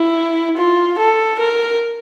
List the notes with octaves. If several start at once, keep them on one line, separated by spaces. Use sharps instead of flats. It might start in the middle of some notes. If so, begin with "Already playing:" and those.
Already playing: E4
F4
A4
A#4